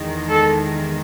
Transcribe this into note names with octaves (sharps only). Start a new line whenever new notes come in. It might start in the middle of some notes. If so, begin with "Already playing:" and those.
Already playing: E2 D#3 G#3
A4